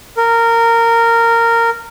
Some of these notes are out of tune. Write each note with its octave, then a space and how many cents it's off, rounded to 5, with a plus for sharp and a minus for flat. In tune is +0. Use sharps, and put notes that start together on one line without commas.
A#4 -15